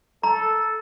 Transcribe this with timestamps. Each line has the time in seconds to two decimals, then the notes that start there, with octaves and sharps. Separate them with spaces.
0.23 A4 A#5